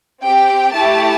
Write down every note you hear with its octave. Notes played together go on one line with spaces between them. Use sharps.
C4 G4 G5
A3 E4 G4 A5